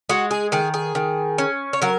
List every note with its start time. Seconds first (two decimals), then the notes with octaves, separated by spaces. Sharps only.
0.09 G#3 F#4
0.31 G#4
0.52 D#3 G#4
0.74 G#4
0.95 D#3
1.38 C#4
1.73 C#5
1.82 F#3 A#4